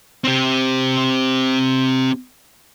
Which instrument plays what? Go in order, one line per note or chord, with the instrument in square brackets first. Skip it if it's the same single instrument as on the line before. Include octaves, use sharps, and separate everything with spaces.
[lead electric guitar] C4 G4